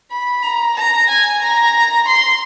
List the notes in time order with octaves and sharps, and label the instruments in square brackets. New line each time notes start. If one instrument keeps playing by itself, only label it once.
[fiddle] B5
A#5
A#5
G#5
A#5
C6